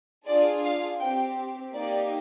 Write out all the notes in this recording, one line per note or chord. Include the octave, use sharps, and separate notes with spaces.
D4 F4 G#4 D5
F5
C4 G4 G5
A#3 D#4 G4 D5